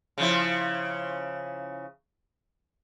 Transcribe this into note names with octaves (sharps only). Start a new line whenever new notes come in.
C#3 F3 E4